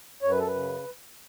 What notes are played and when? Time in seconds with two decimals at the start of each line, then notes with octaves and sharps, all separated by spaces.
0.23 F#2 C#5
0.31 B4
0.39 A4
0.47 B4
0.55 C#3